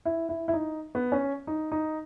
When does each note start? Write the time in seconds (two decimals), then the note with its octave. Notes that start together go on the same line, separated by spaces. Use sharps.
0.05 E4
0.29 E4
0.48 E4
0.53 D#4
0.95 B3
1.12 C#4
1.47 D#4
1.72 D#4